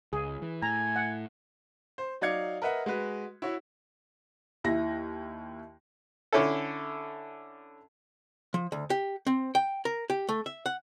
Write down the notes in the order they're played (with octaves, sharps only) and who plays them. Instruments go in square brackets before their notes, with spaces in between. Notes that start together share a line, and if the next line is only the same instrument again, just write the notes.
[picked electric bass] C#2 [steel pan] G#4
[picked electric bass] E3
[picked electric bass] A2 [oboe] G#5 [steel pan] A#5
[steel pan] F#5
[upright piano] C5
F#3 D#4 D5 F5 G#6 C#7
A#4 B4 D#5 E5 F#5
G#3 F#4 B4
E4 F#4 C#5
[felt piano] D#2 E4 A#6
[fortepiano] D3 C#4 E4 A4
[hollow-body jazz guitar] F3
D2
G4
C4
G5
A#4
G4
A3
E5
F#5